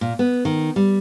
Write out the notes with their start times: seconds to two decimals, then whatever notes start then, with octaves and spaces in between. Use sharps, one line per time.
0.01 A#2
0.19 B3
0.45 D#3
0.76 G3